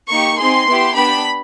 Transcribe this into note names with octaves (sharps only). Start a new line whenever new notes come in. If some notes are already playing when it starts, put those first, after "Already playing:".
A#3 D#4 G4 C#6
C4 D#4 G#4 C6
B3 E4 G4
B3 D4 G4 B5